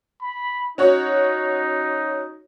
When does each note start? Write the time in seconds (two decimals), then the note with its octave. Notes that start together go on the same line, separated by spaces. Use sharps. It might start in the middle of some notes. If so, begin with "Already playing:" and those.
0.22 B5
0.78 C#4 D#4 F#4 C#5